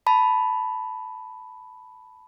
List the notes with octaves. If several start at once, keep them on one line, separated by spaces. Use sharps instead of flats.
A5 B5